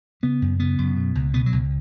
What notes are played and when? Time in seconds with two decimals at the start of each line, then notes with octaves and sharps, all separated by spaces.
0.23 C#3 B3
0.42 F#2
0.60 C#3 B3
0.78 F#2
0.96 B2
1.15 C#2
1.33 B2 B3
1.46 F#3
1.52 C#2